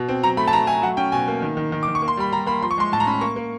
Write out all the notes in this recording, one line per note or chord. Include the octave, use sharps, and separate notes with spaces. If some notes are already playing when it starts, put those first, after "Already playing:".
Already playing: B2
C4
F#3 A#5
A3 B5
A5
F#3 A#5
A3 G#5
F#3 F#5
C#4 G5
B2 G#5
A#3
D#3
D#3
D#3
D6
D#3
C#6
A#3
C6
G3 B5
G3 A#5
A#3 B5
F3 C6
C#6
G#3 C6
A2 A5
A#5
C#4 B5
A#3 C#6
A#3